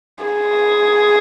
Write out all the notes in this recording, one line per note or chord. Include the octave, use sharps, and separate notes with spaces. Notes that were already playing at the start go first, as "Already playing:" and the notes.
G#4